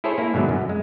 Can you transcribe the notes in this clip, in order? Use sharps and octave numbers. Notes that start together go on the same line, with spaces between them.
E4 G#4 A4 C5 C#5
A#3 E4
G#2 B2 D3 F#3
F#2
G#3